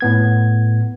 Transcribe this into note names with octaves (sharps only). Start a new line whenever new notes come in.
A2 B3 G#6